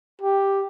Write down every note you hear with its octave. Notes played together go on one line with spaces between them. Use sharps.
G4